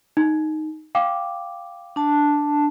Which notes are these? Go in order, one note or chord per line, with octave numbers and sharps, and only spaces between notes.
D#4
F5 G5 D6
D4 A5